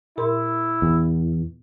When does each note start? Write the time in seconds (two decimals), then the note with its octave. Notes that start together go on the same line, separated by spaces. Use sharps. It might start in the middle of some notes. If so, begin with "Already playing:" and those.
0.18 A#2 E4 A#4 C6
0.82 E2